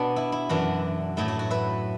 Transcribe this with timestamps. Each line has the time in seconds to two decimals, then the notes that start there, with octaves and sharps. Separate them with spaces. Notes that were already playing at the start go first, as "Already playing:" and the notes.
Already playing: B2 B3 D4 F#4
0.16 E4
0.32 E4
0.49 F#2 E3 D4 F#4
1.17 A2 F#3 A3 E4
1.28 F#4
1.39 F#4
1.51 B4 E5